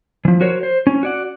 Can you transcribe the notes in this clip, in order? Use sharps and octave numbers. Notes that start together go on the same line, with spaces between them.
E3 F3
F#4 A#4 C5 C#5
C5
C#4
F#4 D5 F#5